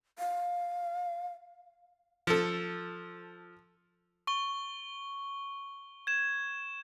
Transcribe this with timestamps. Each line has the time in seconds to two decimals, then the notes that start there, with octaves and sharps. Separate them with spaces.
0.19 F5
2.27 F3 A4
4.27 C#6 G7
6.07 G#6 E7